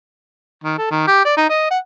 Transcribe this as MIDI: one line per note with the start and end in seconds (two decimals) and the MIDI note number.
0.64 0.77 51
0.78 0.88 69
0.91 1.06 51
1.07 1.24 67
1.25 1.33 74
1.37 1.45 63
1.49 1.66 75
1.71 1.78 78